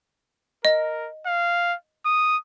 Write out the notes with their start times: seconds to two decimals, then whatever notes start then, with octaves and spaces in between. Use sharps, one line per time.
0.65 A#4 D#5
1.26 F5
2.06 D#6